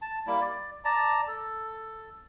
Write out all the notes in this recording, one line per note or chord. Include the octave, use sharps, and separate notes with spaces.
A5
G3 A#3 E4
D5
D5 A5 A#5
A4